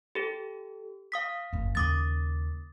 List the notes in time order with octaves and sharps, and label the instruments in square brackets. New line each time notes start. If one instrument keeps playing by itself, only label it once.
[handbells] G4 A4
F5 D#6 B6
[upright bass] F#1 F#2
[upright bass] D#2 C#3 [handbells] D6 D#6 A6